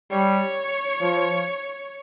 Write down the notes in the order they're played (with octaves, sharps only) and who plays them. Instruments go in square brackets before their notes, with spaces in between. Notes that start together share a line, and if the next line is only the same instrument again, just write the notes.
[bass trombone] G3 [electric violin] C#5
[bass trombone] F3